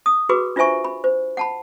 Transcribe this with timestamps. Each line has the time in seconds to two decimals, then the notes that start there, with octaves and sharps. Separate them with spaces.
0.06 D#6
0.29 F#4 G#4 B4 B5 D6
0.56 D4 F4 C5 E5 G#5 C#6
0.85 B5
1.04 C5
1.37 F#5 A5 B5